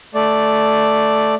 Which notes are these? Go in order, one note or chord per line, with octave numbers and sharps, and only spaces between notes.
A3 D5